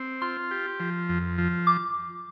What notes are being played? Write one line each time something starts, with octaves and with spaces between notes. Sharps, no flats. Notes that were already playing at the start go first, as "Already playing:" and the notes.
Already playing: C4
F4 C6
G4
F3
F2
F3
D6